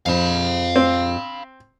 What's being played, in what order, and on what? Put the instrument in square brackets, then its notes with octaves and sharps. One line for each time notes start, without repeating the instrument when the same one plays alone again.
[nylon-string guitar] F2 F3 [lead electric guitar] F5 B5
[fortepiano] C4